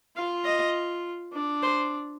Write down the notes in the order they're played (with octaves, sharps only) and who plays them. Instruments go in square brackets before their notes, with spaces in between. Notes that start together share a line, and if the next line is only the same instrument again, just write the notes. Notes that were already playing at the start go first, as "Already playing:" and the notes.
[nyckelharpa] F4 [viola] F5
[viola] D#5
[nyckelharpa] D4
[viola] C5